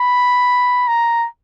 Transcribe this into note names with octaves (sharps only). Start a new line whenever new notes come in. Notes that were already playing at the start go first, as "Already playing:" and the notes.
Already playing: B5
A#5